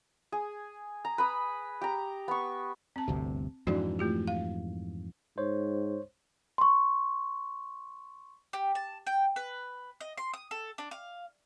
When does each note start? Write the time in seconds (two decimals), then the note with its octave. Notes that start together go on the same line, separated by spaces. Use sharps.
0.32 G#4
1.05 A#5
1.18 B4 B5 D#6
1.81 G4 A#5
2.28 B3 C#6
2.96 C4 A5
3.08 G1 D2 C3
3.67 F2 G#2 E3 D4 F#4 D5
3.99 A3 F4 G4
4.28 F5
5.38 G#2 C5 C#5
6.58 C6 C#6
8.53 G4
8.75 A5
9.06 G5
9.36 B4
10.01 D#5
10.18 C6
10.33 D#6
10.51 A4
10.78 D4
10.91 F5